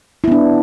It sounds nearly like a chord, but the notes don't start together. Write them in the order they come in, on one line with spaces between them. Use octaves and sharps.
E4 B3 D4